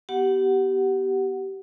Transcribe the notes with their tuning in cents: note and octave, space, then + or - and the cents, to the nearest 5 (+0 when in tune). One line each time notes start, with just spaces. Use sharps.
B3 +0 G4 -20 F#5 +0